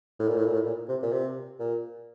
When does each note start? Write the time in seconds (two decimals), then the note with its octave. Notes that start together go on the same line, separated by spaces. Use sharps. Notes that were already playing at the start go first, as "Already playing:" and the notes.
0.19 A2
0.28 A#2
0.37 A2
0.45 A#2
0.54 A2
0.66 A#2
0.89 C3
1.02 A#2
1.13 C3
1.59 A#2